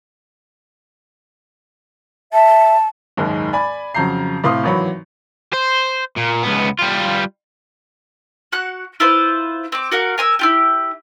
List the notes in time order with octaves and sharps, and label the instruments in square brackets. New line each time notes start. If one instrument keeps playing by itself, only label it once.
[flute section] E5 [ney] A5
[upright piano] F#1 D#2 G#2 G#3
D5 G#5 B5
F2 C#3 F#3 A#5 G6 C7
A2 C3 F5 C6 D#6
G#1 E3 F#3 C#5 B5
[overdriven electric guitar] C5
A#2
C#2 B3
G3 F4
[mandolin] F#4 F#5 F#6
E4 F4 B4 C5
C4 D6
F#4 A#4 F5 F#5
A#4 G#5 E6
E4 F4 G4